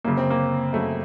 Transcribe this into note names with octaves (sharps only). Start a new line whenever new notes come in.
F#2 C#3 A#3
C4
A#3
F#2 C#3 A3